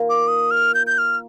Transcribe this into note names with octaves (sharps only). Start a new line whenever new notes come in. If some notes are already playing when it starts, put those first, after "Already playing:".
Already playing: D#3 A#3 F4
D6
D#6
F6
G6
G6
F6